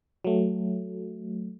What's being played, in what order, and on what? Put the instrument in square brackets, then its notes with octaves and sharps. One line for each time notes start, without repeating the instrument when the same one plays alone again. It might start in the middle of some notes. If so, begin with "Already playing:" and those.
[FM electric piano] F#3 A3